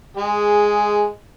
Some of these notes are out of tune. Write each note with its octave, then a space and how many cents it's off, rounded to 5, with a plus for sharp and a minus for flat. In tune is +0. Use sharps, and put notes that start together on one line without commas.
G#3 +0 G#4 -5